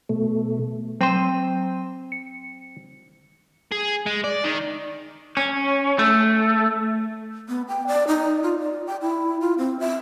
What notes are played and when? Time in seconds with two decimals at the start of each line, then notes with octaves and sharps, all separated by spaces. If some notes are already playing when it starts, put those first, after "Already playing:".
0.09 B2 A3
1.01 F#3 C4 C5 G5 D#7
2.12 C#7
3.72 G#4
4.06 G#3
4.24 D5
4.44 D#3
5.37 C#4
5.99 A3
7.49 B3
7.68 G5
7.87 D5
8.08 D#4
8.43 F4
8.60 D5
8.87 G5
9.01 E4
9.41 F4
9.58 C4
9.80 E5